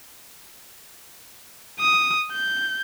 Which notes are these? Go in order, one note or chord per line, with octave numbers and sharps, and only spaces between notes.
D#6
G6